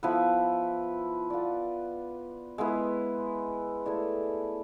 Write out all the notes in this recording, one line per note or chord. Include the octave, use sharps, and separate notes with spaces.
F3 B3 E4 B4
B3 F4 B4 D5
G#3 B3 E4 B4
A3 E4 G#4 D5